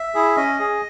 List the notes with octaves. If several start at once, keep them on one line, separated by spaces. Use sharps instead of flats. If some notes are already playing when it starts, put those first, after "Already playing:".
Already playing: E5
E4 G#4
C#4 D#5
G#4